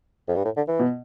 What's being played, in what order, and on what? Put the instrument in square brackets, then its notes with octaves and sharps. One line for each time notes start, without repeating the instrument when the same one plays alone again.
[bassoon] F2
G2
A2
D3
E3
[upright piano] B2